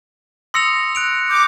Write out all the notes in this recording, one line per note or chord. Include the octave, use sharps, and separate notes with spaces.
C6 D#6 E6 A#6 C#7 F7
F#6 D7 F7
D6 G6